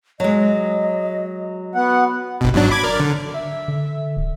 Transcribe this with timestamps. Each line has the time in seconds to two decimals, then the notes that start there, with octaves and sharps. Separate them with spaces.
0.20 F#3 G#3 D#5
1.75 B3 F#4 F#5
2.41 G1 B2
2.54 G#2 F#3 D4
2.71 B5 D6 G#6
2.84 A#4 D5
3.00 D3
3.35 E5
3.68 D3
4.17 D1